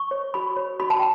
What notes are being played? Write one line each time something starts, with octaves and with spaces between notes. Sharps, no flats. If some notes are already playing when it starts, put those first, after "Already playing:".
Already playing: C#6
C#5
F#4 B5
C#5
F#4 B5
A5
G5